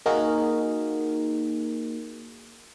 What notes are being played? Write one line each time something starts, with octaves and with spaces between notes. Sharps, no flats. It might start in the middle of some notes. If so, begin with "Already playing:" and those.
A#3 D#4 F#4 G#4 A#4